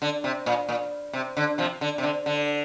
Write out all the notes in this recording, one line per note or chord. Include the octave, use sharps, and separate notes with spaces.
D3
C3
A#2
A#2
C3
D3
C3 F3
D3
C3
D3
D3